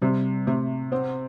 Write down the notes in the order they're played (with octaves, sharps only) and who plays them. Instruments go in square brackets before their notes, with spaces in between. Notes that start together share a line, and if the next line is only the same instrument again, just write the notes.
[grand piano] C3 [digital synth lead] G3
[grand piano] C3 [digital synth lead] A3
[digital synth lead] B3 [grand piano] C4